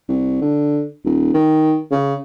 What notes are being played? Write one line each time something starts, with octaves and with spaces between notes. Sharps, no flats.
C2
D3
D#1
D#3
C#3